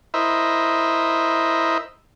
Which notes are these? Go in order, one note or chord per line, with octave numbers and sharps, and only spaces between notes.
E4 A#4 C5 D#5 E5